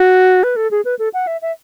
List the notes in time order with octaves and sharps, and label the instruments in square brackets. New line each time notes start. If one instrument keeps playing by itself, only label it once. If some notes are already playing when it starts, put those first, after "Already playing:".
Already playing: [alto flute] F#4
B4
A4
G#4
B4
A4
F#5
E5
E5